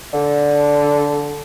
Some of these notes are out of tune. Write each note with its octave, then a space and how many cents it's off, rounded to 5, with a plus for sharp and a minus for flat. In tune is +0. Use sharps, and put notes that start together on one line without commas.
D3 -10